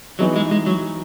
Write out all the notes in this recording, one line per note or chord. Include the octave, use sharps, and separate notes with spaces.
E3 F#3 B3 D#4 G#4 B4
G#3
G#3
F#3